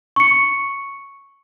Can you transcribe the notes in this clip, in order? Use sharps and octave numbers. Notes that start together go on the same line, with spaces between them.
C#6 C#7